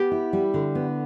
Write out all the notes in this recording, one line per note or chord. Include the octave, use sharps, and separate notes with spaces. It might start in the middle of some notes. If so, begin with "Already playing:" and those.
Already playing: B3 G4
E4
G3
D3
B3